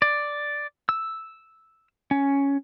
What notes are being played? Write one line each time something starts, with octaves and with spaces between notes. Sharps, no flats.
D5
E6
C#4